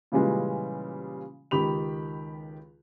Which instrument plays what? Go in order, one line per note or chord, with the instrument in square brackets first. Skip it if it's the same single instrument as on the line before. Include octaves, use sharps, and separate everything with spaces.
[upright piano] A#2 C#3 E3 G3 G#3
C#2 D#3 G4 B5 F7